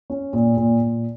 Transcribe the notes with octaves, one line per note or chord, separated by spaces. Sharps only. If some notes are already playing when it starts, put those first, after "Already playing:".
C#4
A#2
A#2
A#2